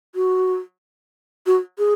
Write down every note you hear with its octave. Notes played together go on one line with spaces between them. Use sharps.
F#4
F#4
G#4